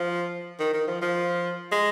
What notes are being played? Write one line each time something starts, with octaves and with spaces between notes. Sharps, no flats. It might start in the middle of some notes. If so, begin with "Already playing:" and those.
Already playing: F3
D#3
D#3
F3
F3
G#3